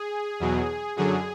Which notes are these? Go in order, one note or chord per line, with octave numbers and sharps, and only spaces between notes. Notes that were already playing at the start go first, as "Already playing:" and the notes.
Already playing: G#4
E2 B2 F#3
F#2 D3 F#3 G#4